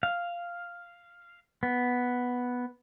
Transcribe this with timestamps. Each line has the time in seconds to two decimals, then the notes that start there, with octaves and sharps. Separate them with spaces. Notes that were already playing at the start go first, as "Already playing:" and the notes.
0.03 F5
1.63 B3